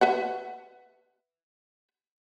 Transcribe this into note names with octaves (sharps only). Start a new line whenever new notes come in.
B4 E5 F#5